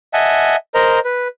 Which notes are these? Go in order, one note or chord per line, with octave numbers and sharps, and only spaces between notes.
D#5 E5 F#5 G#5 A5
A#4 C5 D#5 A#5
B4